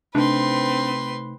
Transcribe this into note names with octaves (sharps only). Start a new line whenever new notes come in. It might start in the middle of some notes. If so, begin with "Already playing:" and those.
C3 A3 C4 D4 D#4 B4 C6